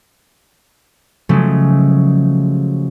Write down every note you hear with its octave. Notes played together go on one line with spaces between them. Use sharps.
C#3 F3 F#3 G#3 A3